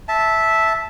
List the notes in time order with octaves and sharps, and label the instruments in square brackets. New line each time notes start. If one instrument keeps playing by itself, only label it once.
[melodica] E5 A5